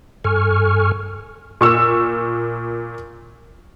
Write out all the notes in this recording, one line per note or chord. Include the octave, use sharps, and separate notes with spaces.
G2 A4 G#5 C#6 F6
A#2 C#6 E6